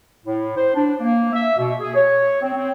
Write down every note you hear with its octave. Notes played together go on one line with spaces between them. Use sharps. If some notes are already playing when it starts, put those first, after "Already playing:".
A2
C5
D4
A#3
E5
B2
G#4
C#5
C4
C4